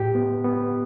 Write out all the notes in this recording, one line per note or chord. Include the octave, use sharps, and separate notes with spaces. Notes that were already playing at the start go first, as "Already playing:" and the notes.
Already playing: A2 G4
B3
B3